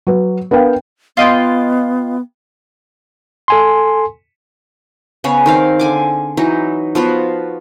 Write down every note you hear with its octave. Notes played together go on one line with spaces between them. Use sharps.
F#3 B4
B3 D4 A#4 F5 G5
B3 F4 D#5 G5
A4 G#5 C6
C#3 B3 G#4 C#5
D#3 C4 F5
D3 G#5 D6
E3 F#3 D#4
F3 B3 F4 F#4